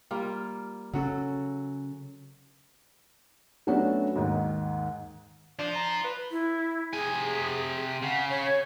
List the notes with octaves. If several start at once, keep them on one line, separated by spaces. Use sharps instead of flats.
G3 A#3 F4
C#3 F#3 C#4 F#4 A4
F#3 A3 B3 C#4 D4 F#4
D#2 G#2 D#3
D4 F4 C5
A#5
B4
E4
C3 G#4 G#5
C#3 F#5
C#5